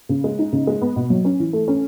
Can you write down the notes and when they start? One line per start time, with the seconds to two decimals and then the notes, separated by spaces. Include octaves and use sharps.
0.09 C#3
0.24 G#3
0.39 D#4
0.52 C#3
0.67 G#3
0.81 B3
0.96 B2
1.10 F#3
1.25 C#4
1.40 E3
1.53 A3
1.68 C#4